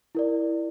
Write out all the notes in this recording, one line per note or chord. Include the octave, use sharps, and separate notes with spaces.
E4 A#4 D5